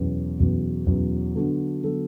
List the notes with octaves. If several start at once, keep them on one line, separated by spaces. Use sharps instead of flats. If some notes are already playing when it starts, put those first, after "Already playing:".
Already playing: E2 B2 F#3 C#4
E2 B2 F#3 C#4
E2 B2 F#3 C#4
D3 F#3 B3 F#4 A4
D3 F#3 B3 F#4 A4